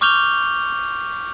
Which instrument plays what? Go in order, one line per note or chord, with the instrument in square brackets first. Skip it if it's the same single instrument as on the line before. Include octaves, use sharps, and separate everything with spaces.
[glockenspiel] C#6 D6 F6 G6 F7 G7